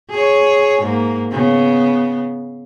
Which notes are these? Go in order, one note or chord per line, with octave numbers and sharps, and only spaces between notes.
G#4 C#5
G#2 A#3
C#3 B3